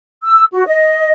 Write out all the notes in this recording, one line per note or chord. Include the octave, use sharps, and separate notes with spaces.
E6
F#4
D#5